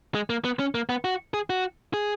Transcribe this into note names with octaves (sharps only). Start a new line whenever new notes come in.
G#3
A#3
B3
C#4
A#3
B3
F#4
G#4
F#4
G#4